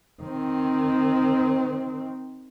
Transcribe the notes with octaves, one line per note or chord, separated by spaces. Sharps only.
D#3 C4